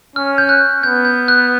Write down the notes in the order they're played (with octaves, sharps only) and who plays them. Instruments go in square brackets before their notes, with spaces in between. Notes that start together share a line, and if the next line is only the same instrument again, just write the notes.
[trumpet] C#4 [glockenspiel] F6
[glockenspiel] G6
F#6
[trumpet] B3 [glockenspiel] G6
[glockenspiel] G6
F#6